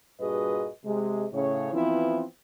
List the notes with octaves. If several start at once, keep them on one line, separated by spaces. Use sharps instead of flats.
G2 A#2 F#4 G#4 B4 D#5
C3 G#3
A2 C#3 C#5
E3 F3 B3 C4 E4